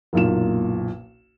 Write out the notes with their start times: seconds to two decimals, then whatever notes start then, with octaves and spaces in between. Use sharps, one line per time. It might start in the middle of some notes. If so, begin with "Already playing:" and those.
0.13 F#1 B1 A#2 E7